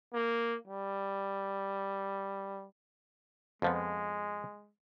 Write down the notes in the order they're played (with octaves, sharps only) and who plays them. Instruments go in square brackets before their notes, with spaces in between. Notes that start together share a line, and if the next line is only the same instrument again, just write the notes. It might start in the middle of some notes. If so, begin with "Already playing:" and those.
[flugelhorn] A#3
G3
[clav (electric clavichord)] F2 F3 B3 [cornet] G#3